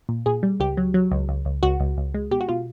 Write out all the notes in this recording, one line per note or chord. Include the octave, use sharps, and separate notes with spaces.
A#2
A#2 G#4
G3
C#2 G4
F#3
F#3
C#2
C#2
C#2
C#2 F#4
C#2
C#2
G#3
B2 G4
F#4
B2 F4